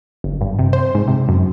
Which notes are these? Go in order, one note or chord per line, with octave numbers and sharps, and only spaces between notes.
G1
G2
C3
C5
G#2
C3
F#2